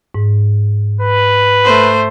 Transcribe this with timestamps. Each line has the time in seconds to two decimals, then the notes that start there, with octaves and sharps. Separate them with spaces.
0.15 G#2
1.01 B4
1.64 A3 C5